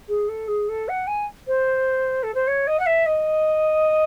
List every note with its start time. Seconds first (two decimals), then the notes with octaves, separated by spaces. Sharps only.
0.08 G#4
0.28 A4
0.48 G#4
0.68 A4
0.88 F#5
1.07 G#5
1.47 C5
2.23 A4
2.34 C5
2.47 C#5
2.67 D#5
2.79 F#5
2.86 E5
3.06 D#5